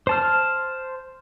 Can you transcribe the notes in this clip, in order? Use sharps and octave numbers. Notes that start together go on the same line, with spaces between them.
C5 A5 F6